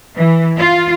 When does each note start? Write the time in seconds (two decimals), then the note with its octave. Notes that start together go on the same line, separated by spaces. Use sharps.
0.16 E3
0.58 F4